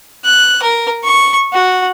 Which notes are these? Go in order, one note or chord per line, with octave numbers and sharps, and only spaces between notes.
F#6
A#4
C#6
F#4